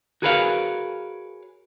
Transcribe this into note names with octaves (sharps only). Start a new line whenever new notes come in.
F#4 G#4 A#4 B4 C#5 F5